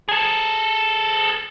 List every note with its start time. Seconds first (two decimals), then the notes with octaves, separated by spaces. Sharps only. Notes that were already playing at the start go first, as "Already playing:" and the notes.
0.09 G#4 A4